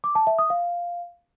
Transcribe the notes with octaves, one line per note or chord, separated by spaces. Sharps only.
D6
A5
E5
D#6
F5